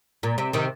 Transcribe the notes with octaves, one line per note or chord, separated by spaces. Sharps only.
A#2
C3
C3 D#3